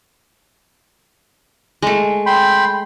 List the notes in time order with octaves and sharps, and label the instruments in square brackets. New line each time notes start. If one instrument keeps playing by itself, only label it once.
[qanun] G#3 A3
[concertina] G5 B5 C6